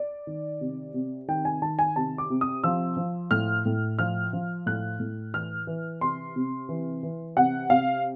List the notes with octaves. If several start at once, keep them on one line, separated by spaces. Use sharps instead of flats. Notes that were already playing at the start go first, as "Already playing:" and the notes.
Already playing: D5
D#3
C3
C3
D#3 G5
G#5
D#3 A5
G#5
C3 A5
D6
C3
D#6
F3 E6
F3
A2 F6
A2
F3 F6
F3
A2 F#6
A2
E3 F6
E3
C3 C6
C3
E3
E3
C3 F#5
C3 F5